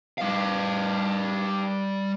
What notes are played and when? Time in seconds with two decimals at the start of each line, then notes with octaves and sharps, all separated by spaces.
0.18 G3 F5